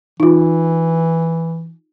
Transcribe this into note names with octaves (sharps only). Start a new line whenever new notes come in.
E3 D#4 F4